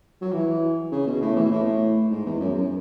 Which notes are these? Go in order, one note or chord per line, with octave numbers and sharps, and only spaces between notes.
F#3
E3
C#3
B2
A2
E3
B2
A2
G#2
E2
F#2
F#2